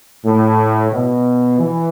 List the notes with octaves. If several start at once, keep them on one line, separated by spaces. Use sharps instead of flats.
A2
B2
E3